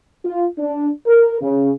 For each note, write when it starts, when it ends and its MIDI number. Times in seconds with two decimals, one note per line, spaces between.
0.24 0.45 65
0.58 0.88 62
1.07 1.39 70
1.41 1.71 49